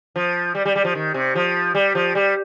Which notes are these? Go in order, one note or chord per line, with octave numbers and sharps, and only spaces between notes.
F3
G3
G3
G3
F3
D#3
C3
F3
G3
F3
G3